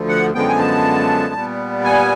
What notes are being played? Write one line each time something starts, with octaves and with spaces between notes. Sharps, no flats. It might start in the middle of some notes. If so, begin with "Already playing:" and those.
Already playing: D2 D3 F3
F#5
F#2 D3 F3 G#3 B3 G5
G#5
A5
A#2 G3 B3
G#5